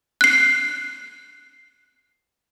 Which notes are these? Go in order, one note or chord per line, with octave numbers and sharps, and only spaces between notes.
F#6 C7